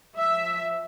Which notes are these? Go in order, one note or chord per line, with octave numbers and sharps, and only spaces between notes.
F3 E5